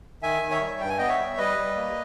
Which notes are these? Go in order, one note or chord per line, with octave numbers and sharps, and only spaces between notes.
D#3 E5 G#5
D#3
C#5 E5
G3
G2 G5
G#5
B3 D#5 G5
C#5 E5
G3
G3 B4 D#5
G3
A#3